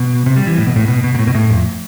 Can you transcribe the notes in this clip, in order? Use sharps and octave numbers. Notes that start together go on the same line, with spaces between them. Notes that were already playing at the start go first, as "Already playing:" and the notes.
Already playing: B2
C3
G3
E3
A2
B2
A2
B2
B2
B2
A2
B2
A2
F2